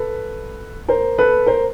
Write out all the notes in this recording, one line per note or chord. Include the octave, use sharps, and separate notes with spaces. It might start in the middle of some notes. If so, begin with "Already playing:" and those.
Already playing: A4 B4
A#4 C5
A4 B4
A#4 C5